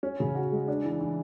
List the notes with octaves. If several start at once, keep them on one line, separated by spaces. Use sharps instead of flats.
C#4
C#3
F#4
G#3
D4
E3
E3